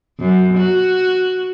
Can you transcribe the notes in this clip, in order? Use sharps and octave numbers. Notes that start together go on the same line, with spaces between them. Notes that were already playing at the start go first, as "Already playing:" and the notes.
F#2
F#4